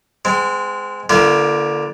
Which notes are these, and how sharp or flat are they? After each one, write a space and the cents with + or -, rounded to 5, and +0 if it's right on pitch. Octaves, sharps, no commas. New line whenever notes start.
G#3 +0 C4 -35
D3 +0 A#3 +30 F4 -40